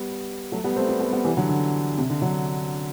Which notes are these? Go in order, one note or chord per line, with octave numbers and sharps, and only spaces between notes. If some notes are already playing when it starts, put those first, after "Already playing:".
Already playing: G3 B3
F#3 A3
G3 B3
A3 C4
G3 B3
G3 B3
G3 B3
E3 G3
D3 F#3
D3
C3
D3
D3 F#3